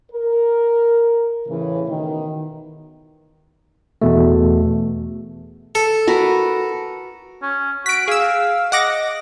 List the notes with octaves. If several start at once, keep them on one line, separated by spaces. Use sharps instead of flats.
A#4
A2 C#3 E3
B2 D#3
E2 B2 A3
A4
F#4 A#4 B4
C#4
F#4 B6 D7
G#4 F5 E6
D#5 F#5 D6 A#6